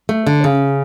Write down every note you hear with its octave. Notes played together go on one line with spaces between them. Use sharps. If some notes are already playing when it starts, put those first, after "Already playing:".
A3
D3
C#3